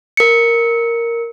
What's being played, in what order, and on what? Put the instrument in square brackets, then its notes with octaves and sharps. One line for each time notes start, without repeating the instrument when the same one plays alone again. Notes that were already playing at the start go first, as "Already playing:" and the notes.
[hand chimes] A#4 C#7